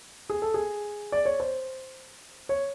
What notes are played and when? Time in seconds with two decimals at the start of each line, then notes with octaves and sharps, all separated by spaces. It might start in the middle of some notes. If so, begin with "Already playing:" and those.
0.30 G#4
0.42 A4
0.54 G#4
1.12 D5
1.25 C#5
1.40 C5
2.49 C#5